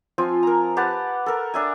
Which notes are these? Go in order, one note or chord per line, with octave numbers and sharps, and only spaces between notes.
F3 C4 F4 G#5
A#4 A#5
G4 B4 F#5 A5
A4 A#4
D4 E5 G#5